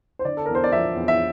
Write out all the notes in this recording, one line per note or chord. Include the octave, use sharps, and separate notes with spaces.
C5
D3 D5
A4
A#4
E2
C5
D5
F3 E5
E2
E5